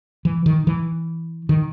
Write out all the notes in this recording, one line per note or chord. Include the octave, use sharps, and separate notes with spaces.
E3
D#3
E3
D#3